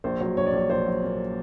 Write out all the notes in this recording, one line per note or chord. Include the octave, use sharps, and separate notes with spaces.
A#1 C5
F#3
A#1 C#5
D5
A#1 C#5
A#1 C5
F#3
A#2